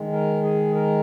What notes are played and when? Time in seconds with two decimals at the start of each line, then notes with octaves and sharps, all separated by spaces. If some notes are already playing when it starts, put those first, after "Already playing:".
Already playing: D#3 G#3
0.13 A#4
0.44 G#4
0.75 A#4